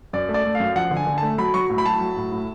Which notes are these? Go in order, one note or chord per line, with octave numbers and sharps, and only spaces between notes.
F#2 D5
A3
D5
A3
F5
F#2
F3 F#5
D3
G#5
D3
A3 A5
F#3 B5
F#3 C#6
A2
B5
F#3 A5
F#3
A2
A2